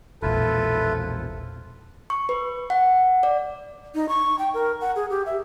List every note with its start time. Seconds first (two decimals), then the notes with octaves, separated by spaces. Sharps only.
0.22 E1 A#1 E4 F4 A4 B4
2.10 C#6
2.29 B4
2.70 F#5
3.23 D5
3.95 D#4
4.09 C#6
4.39 G5
4.54 A#4
4.81 F#5
4.96 G#4
5.10 G4
5.26 E5